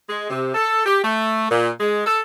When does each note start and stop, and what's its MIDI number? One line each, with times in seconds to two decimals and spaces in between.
0.09 0.27 56
0.30 0.54 48
0.54 0.82 69
0.86 1.00 67
1.04 1.48 57
1.50 1.69 46
1.80 2.06 56
2.06 2.20 69